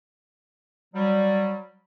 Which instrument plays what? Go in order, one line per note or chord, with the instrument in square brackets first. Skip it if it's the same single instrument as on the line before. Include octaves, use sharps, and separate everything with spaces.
[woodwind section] F#3 G3